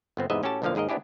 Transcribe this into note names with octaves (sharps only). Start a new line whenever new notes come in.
G1 B3 C4
E2 G#2 C3 B4 D#5 E5
A2 C#4 F#4 G4 A4 A5
B1 A2 D3 F3 A#3 F5
D#2 G#2 G#4 A#4 D#5
B3 C4 D4 E4 G4 G#4